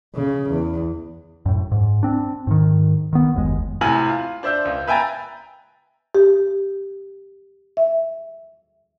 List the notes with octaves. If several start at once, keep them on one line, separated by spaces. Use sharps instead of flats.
C#3
E2
F#2 A2
G#2
C4 D4
G#2 D#3
D#3 B3
F#1 D#2 G#3
A2 C3 B4 G#5 F6 F#7
F4
D4 C5 E5 E6 G6
C#2
B4 E5 G5 G#5 A#5 A6
G4
E5